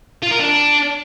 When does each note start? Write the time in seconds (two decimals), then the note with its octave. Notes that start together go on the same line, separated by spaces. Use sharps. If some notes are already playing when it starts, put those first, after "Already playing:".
0.23 F4
0.31 A#4
0.40 D4